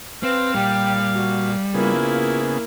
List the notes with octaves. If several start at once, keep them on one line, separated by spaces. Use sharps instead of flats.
C4 B4 F5
A#2 G3 G5
F#4
C#3 A#3 B3 E4 F4 G#4